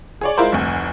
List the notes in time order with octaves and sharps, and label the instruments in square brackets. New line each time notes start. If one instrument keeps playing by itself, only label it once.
[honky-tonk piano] G#4 C#5 D5
G#3 E4 F4 A#4 C5
F1 D2